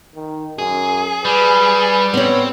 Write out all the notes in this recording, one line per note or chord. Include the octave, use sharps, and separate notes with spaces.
D#3
F#2 G#4
G3 B4
B3 C4 C#5